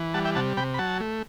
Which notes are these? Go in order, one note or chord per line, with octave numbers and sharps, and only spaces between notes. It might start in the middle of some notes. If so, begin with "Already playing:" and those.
Already playing: E3
G3 F#5 A5
E5 G5
C3 F#5 A5
C3 G5 B5
B5
F#3 F#5 A5
A3